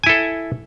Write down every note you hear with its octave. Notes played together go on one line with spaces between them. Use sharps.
E4 A4 G#5